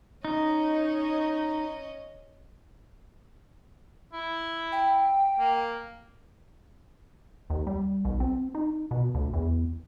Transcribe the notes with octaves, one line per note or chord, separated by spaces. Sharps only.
C#4 D#4 D#5
E4
G5
A#3
D#2
G3
B1
C4
D#4
B2
D2
E2